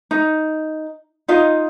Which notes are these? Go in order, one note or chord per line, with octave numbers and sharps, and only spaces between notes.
D#4
D#4 F4 D#5